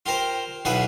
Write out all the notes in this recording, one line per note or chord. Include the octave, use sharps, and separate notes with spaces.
F4 G4 A#4 C5
B1 E3 F4 G#4 B4 F#5